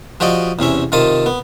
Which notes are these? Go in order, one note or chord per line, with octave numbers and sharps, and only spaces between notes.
F3 F#4 G4 D5 D#5
E2 C3 C#4 E5
C3 D#3 F4 A5 D#6
B3